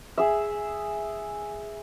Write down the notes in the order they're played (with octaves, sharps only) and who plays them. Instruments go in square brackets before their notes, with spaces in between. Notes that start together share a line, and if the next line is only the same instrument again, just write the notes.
[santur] G#4 E5